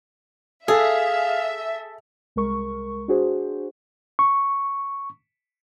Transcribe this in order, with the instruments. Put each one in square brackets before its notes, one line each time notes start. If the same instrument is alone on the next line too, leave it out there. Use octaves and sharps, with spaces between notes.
[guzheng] G#4 [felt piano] A4 [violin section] E5 [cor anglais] F5
[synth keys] C2 G#3 A#4 C#6
D4 F#4 G#4 C5
[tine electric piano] C#6